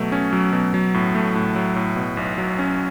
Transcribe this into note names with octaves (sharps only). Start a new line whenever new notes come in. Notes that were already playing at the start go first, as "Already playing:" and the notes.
Already playing: B2 F#3 A3
C#4
F#3
B2
F#3
A2
A3
A2
F#3
A2
B2
B1
F#3
C#4